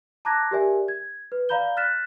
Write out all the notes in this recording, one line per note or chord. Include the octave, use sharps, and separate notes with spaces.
A5 A#5 D6 F#6 G#6 A#6
G4 G#4 A#4 D5 E5 G#5
G#6
B4
D5 F5 A#5 B5 G6 G7
F6 F#6 A6 B6 E7